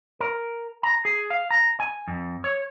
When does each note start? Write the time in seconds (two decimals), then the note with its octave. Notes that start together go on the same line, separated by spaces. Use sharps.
0.20 A#4
0.83 A#5
1.05 G#4
1.30 F5
1.51 A#5
1.80 G#5
2.08 F2
2.44 C#5